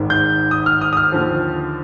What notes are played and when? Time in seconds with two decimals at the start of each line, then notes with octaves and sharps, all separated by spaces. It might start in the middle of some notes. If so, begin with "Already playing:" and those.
Already playing: G#1 G#2 D#3
0.10 G6
0.51 D#6
0.66 F6
0.81 D#6
0.93 D#6
0.97 F6
1.12 D#2 D3 F3